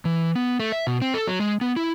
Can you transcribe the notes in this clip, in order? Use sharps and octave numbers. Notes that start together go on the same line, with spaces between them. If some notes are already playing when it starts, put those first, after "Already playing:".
E3
B3
A3
E5
B2
C4
A4
F#3
G#3
B3
E4